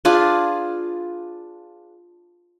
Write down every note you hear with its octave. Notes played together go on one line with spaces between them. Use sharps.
D4 F4 G#4 B4